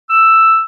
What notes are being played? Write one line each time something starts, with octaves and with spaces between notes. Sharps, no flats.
E6